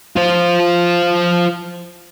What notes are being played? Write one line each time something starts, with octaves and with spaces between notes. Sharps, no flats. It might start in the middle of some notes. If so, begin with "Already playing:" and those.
F4 C5